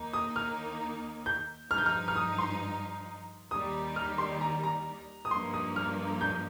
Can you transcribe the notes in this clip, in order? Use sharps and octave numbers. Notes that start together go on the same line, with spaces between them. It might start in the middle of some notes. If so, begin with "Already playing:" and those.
Already playing: D#2 D#3 A#3 D#4
D#6
F6
G6
G2 F3 D#4 F6
G6
F6
F6
D#6
C6
D#2 D#3 G3 D#4 D#6
F6
C6
A#5
A#5
D#6
G2 F3 A#3 D#4 C6
D#6
F6
G6